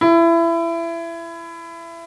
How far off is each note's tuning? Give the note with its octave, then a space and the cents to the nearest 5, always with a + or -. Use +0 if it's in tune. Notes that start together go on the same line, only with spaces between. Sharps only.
E4 +25